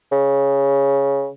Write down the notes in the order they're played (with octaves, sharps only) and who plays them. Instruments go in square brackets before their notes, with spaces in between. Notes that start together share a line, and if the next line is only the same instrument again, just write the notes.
[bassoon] C#3